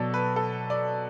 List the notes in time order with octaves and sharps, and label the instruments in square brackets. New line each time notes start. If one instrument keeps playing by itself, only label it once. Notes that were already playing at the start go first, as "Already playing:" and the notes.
Already playing: [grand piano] B2 F#3 A4 D5
B4
A4
D5